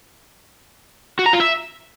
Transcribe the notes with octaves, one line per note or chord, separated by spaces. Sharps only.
F#4
A#5
F4
E5